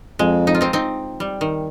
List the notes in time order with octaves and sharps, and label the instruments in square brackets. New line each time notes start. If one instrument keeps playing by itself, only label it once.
[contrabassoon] F2 [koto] G#3
[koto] D#4
F4
C4 D#4
C4 D#4
G3
D#3